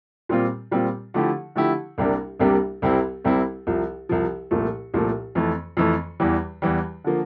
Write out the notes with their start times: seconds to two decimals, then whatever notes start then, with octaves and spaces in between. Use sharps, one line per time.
0.29 A#2 G3 C4 F4
0.71 A#2 G3 C4 F4
1.14 D3 F3 A3 E4 G4
1.56 D3 F3 A3 E4 G4
1.98 C2 C3 G3 A#3 D4
2.40 C2 C3 G3 A#3 D4
2.82 C2 C3 G3 C4 E4
3.25 C2 C3 G3 C4 E4
3.67 C2 C3 F3
4.09 C2 C3 F3
4.51 C2 A#2 F3 A3
4.94 C2 A#2 F3 A3
5.35 F2 E3 A3
5.77 F2 E3 A3
6.20 E2 E3 G3
6.62 E2 E3 G3
7.04 D3 F3 A#3